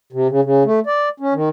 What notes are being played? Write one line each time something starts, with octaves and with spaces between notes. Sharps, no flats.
C3
C#3
C#3
A3
D5
C#4
D#3